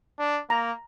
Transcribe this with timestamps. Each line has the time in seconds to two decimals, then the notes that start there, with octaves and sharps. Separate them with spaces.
0.19 D4
0.50 A#3 A#5